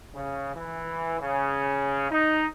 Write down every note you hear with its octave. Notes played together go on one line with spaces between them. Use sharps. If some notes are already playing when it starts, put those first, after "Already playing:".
C#3
E3
C#3
D#4